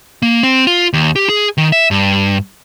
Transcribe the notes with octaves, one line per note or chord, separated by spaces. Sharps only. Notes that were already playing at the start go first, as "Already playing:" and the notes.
A#3
C4
F4
D#2
G4
G#4
D#3
E5
G2